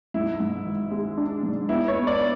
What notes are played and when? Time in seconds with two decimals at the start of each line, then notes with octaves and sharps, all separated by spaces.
0.14 G#2 E4
0.40 G#2
0.66 G#1
0.91 G#3
1.17 D4
1.43 G#2
1.69 B3 E4
1.88 C#5
1.95 B3
2.07 D5